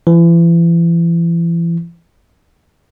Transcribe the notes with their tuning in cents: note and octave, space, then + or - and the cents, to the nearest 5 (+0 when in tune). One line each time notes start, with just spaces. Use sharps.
E3 +35